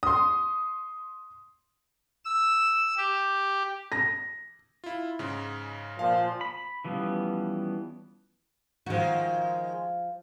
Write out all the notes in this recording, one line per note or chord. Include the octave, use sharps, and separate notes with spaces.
C6 D#6
E6
G4
A#6
E4 F4
G#2 C#3 G#3
A#2 F3 F5
B5
E3 F3 G3 B3 C#4
D#3 F3 G#3 F#4